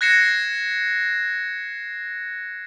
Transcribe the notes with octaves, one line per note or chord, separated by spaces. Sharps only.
F#6 G#6 A#6 C7 C#7 E7